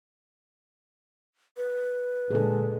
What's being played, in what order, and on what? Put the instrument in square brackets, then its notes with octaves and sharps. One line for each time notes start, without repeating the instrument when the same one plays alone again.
[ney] B4
[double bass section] A#2 D3 G#3 [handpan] G#4 A4